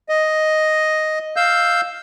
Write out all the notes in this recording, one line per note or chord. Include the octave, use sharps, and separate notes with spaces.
D#5
F5 E6 G6